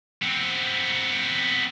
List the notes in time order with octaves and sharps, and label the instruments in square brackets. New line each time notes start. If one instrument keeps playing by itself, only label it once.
[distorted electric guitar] B3 C4